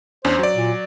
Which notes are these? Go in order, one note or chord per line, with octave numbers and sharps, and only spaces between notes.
E2 C#4 D4 C5
F#3 D5
A#2